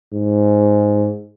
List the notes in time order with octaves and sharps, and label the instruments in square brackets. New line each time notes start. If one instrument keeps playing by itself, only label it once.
[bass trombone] G#2